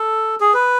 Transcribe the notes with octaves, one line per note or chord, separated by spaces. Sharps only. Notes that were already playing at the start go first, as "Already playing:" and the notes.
Already playing: A4
G#4
B4